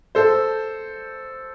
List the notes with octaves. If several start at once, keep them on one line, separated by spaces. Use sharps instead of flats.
A4 C5